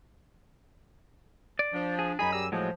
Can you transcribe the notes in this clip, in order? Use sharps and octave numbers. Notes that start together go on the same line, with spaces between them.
D5
F3 D4
G#4
F#2 D#4 G#4 G#5 B5
G3 A#5 E6
A2 F3 F#3 G#3